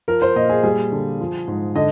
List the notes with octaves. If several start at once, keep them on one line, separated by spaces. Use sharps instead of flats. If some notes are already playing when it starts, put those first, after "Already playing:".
F3 A#4
C5
A#2 D#5
G#4
G3 G#4
D3
F3
G#2
D3 D#5